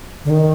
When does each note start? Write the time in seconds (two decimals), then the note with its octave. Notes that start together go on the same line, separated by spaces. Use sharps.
0.25 D3
0.30 D#3